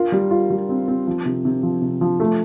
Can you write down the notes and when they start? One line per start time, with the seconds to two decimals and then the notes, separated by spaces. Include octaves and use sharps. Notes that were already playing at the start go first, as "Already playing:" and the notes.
Already playing: F4 A#4
0.12 G3
0.31 F4
0.50 G3
0.69 C4
0.88 C4
1.07 F3
1.25 C3
1.45 C3
1.63 F3
1.82 C3
2.01 F3
2.20 A3